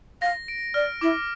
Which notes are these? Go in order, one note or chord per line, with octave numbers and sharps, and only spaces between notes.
F5 A#6
D7
D5 F6
E4 D6